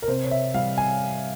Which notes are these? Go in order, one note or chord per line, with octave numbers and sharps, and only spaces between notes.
A#4
C3 C5
C#5
E5
G3 F5
G#5